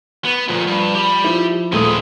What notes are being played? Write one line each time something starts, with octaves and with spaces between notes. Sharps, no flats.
B3
D2 A#2 F3
G2
G4 B5
F3 E4
D#1 F2 G#3 A3 D#6